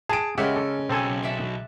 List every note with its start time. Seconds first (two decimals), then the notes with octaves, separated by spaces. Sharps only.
0.09 G#4 A5 D7
0.38 C#3 G#3 C#4 G4 A#4 E5 F#5
0.56 A4
0.89 B1 C4 A4 G#5
1.23 D5 E5 F#5